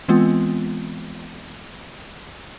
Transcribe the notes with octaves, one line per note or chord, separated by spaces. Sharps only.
E3 G#3 B3 C4 F4